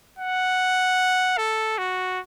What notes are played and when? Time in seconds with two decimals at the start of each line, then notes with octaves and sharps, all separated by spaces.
0.19 F#5
1.37 A4
1.78 F#4